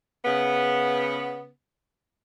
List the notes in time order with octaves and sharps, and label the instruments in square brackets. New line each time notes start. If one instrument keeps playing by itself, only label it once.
[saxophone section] C#3 B3